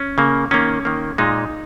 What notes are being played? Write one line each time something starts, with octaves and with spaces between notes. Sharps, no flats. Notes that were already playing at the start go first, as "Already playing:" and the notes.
Already playing: C#4
C#3 A#3
D#3 A#3 C#4
D#3 A#3
A#2 G#3 D#4